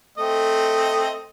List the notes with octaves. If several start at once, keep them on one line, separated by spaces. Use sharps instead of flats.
A3 C4 D#5